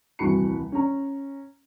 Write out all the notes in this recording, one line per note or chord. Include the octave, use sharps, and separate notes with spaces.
D#1 C2 E3 F#4 B5 C#7
C#4 A#5